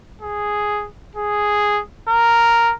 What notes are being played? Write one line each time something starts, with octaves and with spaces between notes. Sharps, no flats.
G#4
G#4
A#4